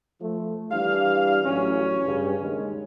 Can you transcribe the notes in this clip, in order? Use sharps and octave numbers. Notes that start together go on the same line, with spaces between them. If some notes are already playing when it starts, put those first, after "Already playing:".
F3 A3
E3 G3 D4 F5
A1 F#3 C#4
G2 C#3
D#2 D#3 G#3